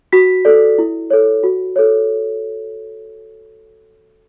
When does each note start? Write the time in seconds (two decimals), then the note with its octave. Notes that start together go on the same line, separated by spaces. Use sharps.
0.13 F#4 B6
0.45 A4 D5
0.78 E4
1.10 A4 C#5
1.43 F#4
1.76 A4 C#5